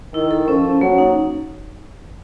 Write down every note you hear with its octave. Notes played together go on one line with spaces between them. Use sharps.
D#3 E4
A4
F3 C#4
C#4
F#3 A#3
D#4